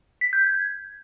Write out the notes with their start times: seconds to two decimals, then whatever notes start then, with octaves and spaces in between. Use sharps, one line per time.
0.21 B6
0.33 G6
0.44 G#6